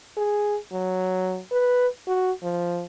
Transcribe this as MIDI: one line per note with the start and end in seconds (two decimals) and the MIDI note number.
0.17 0.57 68
0.72 1.40 54
1.52 1.87 71
2.07 2.32 66
2.43 2.85 53